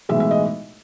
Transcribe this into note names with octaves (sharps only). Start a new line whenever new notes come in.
B1 A2 E3 G#3 E5
E5
D#5